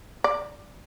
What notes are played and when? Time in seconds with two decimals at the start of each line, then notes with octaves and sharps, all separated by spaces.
0.24 D5